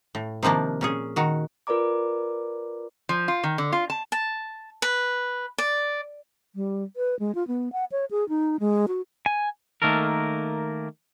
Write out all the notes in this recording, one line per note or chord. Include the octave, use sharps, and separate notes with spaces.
A2
C3 D#3 F3 A#3 D4
A#2 C#4 G#4
D#3 F#4
F4 A#4 B4 D5 A#5 D6
F3
F4
D#3
D3
F4
A5
A5
B4
D5
G3
B4
G#3
F4
B3
F#5
C#5
G#4
D#4
G#3
F#4
G#5
D#3 A3 A#3 A4 A#4